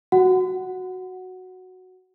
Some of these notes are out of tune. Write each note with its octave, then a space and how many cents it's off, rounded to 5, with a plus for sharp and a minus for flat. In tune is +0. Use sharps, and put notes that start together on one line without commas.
F#4 +0 F#5 +0